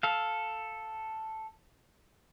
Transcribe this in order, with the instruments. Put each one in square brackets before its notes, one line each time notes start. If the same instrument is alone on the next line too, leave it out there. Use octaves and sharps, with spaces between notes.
[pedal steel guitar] A4 F5